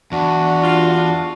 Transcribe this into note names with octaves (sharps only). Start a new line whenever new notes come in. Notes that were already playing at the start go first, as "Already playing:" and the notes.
E2 D4 F#4
G2 F4